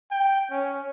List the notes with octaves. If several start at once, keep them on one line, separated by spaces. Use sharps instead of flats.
G5
C#4